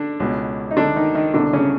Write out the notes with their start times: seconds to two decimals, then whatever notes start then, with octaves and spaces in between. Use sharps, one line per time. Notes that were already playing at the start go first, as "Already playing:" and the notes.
Already playing: D3 D4
0.20 C#2 B2
0.71 D#4
0.77 D3 D4
0.96 D#3 D#4
1.15 D#3 D#4
1.34 C2 B2 D3 D4
1.53 C#3 C#4